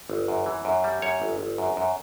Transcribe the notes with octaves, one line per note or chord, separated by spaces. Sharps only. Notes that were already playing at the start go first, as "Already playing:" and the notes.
G1
F#2
E3
F#2
G3
F#2 C#5
G1
G1
F#2
F#2